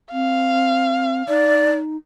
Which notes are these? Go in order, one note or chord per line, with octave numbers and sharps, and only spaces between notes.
C4 F5
D#4 D5